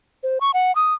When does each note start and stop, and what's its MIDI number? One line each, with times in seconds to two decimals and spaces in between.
0.23 0.38 72
0.41 0.51 85
0.54 0.74 78
0.75 0.94 87